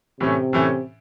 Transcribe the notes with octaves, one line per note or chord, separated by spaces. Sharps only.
A2 C3 E3 A3 C#4
A2 E3 A3 C#4